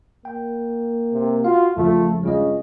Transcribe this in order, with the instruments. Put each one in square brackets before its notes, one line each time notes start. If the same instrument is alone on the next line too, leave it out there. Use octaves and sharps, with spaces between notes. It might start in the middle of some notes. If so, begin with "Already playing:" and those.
[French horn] A#3 [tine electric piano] G5
[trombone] C3
[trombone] F4 [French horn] F#4 [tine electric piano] F5
[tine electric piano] E2 C#3 F3 [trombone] A3 [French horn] F4
[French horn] G2 [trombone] C#3 [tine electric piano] G#3 F4 D#5